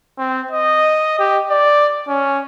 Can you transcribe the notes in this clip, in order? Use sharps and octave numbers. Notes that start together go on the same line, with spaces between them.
C4
D#5
G4
D5
C#4